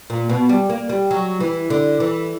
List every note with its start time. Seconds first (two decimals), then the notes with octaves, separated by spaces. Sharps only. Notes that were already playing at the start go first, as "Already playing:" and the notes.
0.10 A#2
0.29 B2
0.49 G3
0.70 A#3
0.89 G3
1.11 F#3
1.40 E3
1.70 D3
2.00 E3